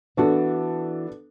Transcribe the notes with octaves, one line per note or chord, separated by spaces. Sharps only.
E3 B3 D4 F#4 A4